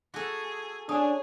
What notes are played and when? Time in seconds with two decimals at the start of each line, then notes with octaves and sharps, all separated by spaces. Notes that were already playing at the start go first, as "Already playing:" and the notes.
0.14 F#4 G#4 A4
0.89 C#4 D4 G#4 G#5 D#6